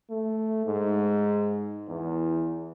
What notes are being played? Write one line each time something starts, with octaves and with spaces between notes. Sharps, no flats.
A3
G#2
E2